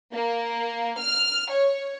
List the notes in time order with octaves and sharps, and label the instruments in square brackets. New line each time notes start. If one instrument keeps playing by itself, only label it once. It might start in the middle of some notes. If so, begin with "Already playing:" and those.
[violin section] A#3
F6
C#5